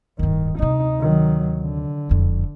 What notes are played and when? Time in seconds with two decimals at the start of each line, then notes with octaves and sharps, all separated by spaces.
0.19 D1 G2 D#3
0.59 D2 C3 D#4
1.01 D#3 F#3
1.61 D3
2.09 E1 F2